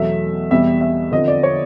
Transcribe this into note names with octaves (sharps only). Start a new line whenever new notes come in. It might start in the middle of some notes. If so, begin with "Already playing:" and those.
Already playing: E2 B2 F#3 A3 E5
E2 B2 G3 E5
E5
F2 D3 F3 D#5
D5
C#5